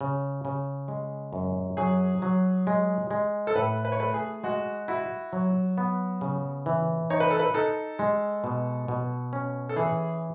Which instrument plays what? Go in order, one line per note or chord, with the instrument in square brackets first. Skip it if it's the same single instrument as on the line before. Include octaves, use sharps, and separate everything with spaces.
[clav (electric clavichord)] C#3
C#3
G#3
F#2
[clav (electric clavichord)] F#3 [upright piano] G#4
[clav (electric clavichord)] F#3
G#3
G#3
[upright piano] A4
[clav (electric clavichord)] A2 [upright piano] B4
[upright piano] B4
C#5
[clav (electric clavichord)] A3 [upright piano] B4
[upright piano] G#4
[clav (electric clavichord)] G#3 [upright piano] F#4
[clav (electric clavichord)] E4 [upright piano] F#4
[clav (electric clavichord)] F#3
B3
C#3
E3
[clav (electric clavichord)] D#4 [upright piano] C#5
[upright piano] B4
A4
B4
[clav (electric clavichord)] D#4 [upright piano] A4
[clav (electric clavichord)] G#3
B2
B2
C#4
[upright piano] A4
[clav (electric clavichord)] E3 [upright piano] G#4